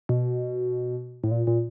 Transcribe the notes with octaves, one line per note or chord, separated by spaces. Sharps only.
B2
A2
A#2
A#2